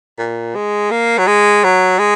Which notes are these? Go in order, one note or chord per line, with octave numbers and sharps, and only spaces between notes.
A#2
G#3
A#3
F#3
G#3
F#3
G#3